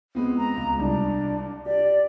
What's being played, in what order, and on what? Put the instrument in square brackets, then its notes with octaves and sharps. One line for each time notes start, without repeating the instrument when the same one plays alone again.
[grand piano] G#3 B3 C4
[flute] A#5
[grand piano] C#2
[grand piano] C2 [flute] D4
[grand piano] G4 [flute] D5